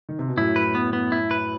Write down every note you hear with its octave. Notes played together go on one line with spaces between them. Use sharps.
D#3
C3
B2
F#2 A2 E4
B4
B3
B3
E4
B4